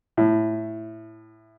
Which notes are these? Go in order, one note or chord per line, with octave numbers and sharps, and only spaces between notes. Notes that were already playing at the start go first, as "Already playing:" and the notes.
A2